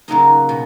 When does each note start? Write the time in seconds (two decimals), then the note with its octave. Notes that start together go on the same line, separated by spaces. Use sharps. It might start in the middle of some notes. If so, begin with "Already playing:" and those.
0.08 C#3 F#3 A#3 D#4 D#5
0.49 B2